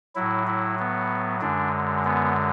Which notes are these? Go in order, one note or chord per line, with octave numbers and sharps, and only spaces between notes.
A2 F#3 E4
E4
B3
F#2 D3 G#3 D4
B3